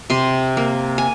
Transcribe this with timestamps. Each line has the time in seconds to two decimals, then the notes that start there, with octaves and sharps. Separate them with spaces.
0.10 C3 C6
0.57 A#3
0.98 G#5